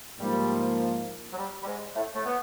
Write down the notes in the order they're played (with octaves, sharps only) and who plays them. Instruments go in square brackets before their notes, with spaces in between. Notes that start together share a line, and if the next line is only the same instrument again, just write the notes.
[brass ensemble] G#2 F3 A#3 [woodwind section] G3
[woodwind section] F#3
G3
G3
G#2 G#3
A2 A3
A2 A3
B3